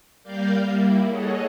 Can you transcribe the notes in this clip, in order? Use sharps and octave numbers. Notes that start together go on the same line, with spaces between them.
G3 A#3 A#4 D5 F5 G6
G3 A#3 E4
G#4 A4 C#5 D#5 F#5